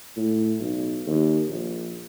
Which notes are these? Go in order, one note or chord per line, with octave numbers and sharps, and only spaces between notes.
A2
B1
D#2
A#1